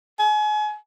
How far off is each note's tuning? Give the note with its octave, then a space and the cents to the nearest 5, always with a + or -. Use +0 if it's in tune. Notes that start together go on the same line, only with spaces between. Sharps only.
G#5 +35